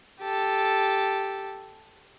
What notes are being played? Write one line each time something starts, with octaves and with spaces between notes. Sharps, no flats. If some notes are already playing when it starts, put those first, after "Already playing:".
G4 A4